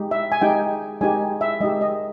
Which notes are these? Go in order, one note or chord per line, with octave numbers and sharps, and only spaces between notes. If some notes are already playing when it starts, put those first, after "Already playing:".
Already playing: G#3 D#4 G4
E5
G#5
G#3 D#4 G4 G5
G#3 D#4 G4 G#5
E5
G#3 D#4 G4 D#5
D#5